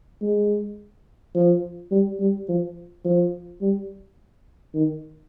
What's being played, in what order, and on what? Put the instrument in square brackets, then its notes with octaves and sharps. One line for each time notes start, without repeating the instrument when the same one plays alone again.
[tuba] G#3
F3
G3
G3
F3
F3
G3
D#3